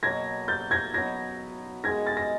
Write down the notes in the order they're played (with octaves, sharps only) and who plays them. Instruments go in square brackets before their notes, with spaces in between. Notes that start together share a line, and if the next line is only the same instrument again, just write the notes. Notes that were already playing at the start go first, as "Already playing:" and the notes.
[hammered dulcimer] B2 F#3 A#3 [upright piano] G#6 A#6
[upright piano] G6 A6
G#6 A#6
[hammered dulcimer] B2 F#3 B3 [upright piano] G#6 A#6
[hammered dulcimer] D#3 G#3 B3 [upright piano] G#6 A#6
[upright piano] A6
A#6